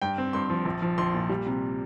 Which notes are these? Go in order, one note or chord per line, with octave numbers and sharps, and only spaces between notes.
G2 G5
C4
G2 C6
F3
A#1
F3
A#1 C6
A#2
G3
C3